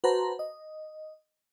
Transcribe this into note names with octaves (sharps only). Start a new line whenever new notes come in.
F#4 B4 C5 A5 A#5
D#5